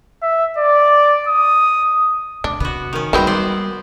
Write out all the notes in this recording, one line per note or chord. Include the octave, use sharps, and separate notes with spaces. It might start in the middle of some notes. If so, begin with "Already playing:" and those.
E5
D5
D#6
C3 D4
C3 B3 F#4
D#3 C#4
D#3 F#3 G3 A#3 C4 B4 C5 A#5
B3 C5 D5